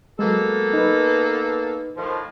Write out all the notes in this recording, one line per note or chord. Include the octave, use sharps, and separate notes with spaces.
F#3 G#3 A#3 B3 A4
D#4 B4
A2 D#3 F3